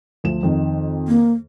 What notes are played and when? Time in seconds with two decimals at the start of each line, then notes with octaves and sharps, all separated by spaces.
0.24 D2 F3 E7
0.43 F2 D#3
1.08 A#3